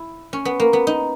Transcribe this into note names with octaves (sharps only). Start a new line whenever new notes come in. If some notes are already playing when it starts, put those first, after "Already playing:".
Already playing: E4
C#4
B3
A#3
B3
D#4